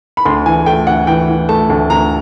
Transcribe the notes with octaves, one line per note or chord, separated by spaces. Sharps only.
B5
D2 C6
E3 G#5
A3 G5
D2 F#5
E3 G5
E3
A3 A5
D2
D2 A#5